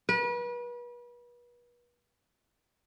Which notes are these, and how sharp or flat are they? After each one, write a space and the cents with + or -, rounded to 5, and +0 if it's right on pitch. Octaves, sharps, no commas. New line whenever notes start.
B4 -35